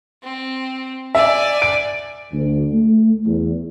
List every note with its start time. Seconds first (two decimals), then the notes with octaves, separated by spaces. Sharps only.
0.23 C4
1.15 D5 E5 G#5
1.62 D7
2.33 D2
2.74 A3
3.26 E2